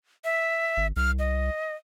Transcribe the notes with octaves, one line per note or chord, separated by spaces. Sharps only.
E5
G#1
C2 F6
D#5